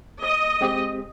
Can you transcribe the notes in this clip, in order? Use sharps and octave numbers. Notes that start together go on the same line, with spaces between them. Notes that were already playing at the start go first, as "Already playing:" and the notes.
D#5
G#3 C4 G4